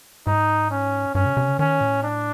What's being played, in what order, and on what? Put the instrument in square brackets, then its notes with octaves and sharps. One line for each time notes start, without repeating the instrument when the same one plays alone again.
[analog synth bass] G#2 [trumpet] D#4
[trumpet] C#4
[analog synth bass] G2 [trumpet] C#4
[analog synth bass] C3
C3
C#3
[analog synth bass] D#3 [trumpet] C#4
[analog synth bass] A2
[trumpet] D4